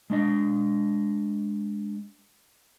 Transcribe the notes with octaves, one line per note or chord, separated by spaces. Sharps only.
G#3 D4 D#5